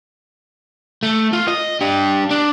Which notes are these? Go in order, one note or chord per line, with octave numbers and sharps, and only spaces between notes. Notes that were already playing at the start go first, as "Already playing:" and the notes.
A3
F4
D#5
D4 G4
D4